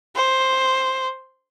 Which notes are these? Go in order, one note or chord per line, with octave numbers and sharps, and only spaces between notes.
C5